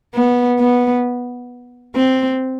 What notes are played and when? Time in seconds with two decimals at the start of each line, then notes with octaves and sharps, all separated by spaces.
0.15 B3
0.59 B3
1.96 C4